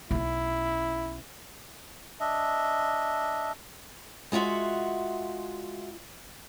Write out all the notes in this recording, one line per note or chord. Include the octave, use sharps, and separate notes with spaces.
B1 C#4 E4
D4 D#5 E5
G#3 F4 F#4 E5 F#5